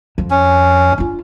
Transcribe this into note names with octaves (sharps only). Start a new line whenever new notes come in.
F2
C#4
D4 F4